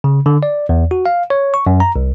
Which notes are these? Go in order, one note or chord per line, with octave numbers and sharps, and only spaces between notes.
C#3
D3
D5
E2
F#4
F5
C#5
C#6
F#2
A#5
C2